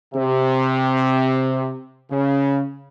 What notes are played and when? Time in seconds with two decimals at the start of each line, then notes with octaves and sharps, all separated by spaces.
0.14 C3
2.11 C#3